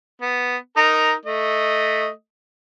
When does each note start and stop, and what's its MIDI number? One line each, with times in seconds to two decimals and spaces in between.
0.21 0.56 59
0.77 1.13 63
0.77 1.13 70
1.25 2.08 57
1.25 2.08 75